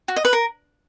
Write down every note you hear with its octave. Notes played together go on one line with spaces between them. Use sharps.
F#4
D#5
B4
A#4